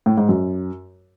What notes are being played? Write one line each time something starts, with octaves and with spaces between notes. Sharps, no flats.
A2
G#2
F#2